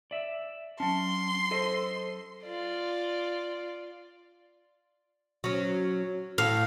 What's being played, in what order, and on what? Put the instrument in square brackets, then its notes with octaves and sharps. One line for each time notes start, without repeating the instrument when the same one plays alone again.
[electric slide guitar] D5 E5
[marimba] F#3 A5 [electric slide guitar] C#4 [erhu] C6
[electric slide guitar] A4 C5 D#5
[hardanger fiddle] F4 D5
[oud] F#3 C#4
[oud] A2 [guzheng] F5